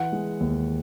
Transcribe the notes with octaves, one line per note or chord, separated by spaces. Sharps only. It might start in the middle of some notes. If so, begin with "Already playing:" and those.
Already playing: E3 F#5
G#3
D#2